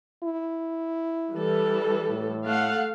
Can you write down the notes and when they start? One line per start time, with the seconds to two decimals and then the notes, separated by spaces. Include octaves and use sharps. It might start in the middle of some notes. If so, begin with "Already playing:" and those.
0.23 E4
1.33 E3 G3 A4
2.09 A2
2.45 A3 F5 F#5